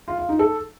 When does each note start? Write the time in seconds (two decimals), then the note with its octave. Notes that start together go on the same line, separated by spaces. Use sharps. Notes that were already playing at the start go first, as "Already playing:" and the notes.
0.08 F4
0.18 F4
0.29 D#4
0.39 A4